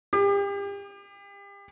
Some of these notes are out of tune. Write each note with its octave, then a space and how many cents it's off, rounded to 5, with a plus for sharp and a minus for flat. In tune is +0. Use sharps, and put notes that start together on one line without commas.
G4 +35